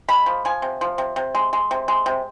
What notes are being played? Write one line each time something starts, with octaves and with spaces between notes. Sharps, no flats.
G#3 B5
F3
F3 G#5
C3
F3
C3
C3
G#3
G#3
C3
G#3
C3